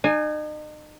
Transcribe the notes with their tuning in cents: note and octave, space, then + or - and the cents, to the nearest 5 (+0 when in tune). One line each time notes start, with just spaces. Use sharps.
D#4 -40 G#5 +0